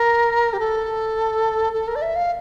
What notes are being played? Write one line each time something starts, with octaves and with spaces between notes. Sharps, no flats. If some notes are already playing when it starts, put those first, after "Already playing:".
Already playing: A#4
G4
A4
A4
A#4
D5
E5
F5